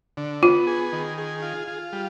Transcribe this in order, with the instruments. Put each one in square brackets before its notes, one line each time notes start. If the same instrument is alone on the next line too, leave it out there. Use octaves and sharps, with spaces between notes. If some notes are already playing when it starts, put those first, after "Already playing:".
[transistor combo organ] D3
[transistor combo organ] B3 [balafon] F4
[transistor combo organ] G#4
D#3
G#4
F4
F4
G3